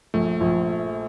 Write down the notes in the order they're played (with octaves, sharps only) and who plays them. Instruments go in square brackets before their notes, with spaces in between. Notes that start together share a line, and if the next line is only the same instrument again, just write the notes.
[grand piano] A#1 [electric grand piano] A3
[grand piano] A#1